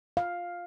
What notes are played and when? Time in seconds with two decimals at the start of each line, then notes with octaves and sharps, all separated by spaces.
0.17 F5